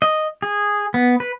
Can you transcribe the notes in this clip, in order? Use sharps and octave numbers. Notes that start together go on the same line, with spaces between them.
D#5
G#4
B3
B4